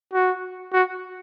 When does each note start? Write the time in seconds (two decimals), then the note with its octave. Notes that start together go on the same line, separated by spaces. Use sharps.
0.14 F#4
0.74 F#4